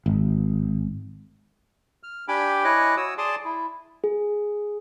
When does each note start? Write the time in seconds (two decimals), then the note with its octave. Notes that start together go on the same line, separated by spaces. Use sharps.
0.06 G#1
2.03 F6
2.28 D4 G4 G5 G#5 B5 D6
2.64 E4 C#5 D#5 G#5 D6 F#6
2.97 F#4 C#5 D#6 E6
3.18 G#4 D5 A5 C6 D6 D#6
3.45 E4
4.04 G#4